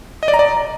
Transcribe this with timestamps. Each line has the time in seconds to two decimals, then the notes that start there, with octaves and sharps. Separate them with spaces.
0.23 D#5
0.28 D5
0.34 A#5
0.39 D5